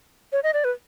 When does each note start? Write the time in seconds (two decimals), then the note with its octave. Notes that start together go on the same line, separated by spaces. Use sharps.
0.32 C#5
0.44 D#5
0.54 D5
0.64 B4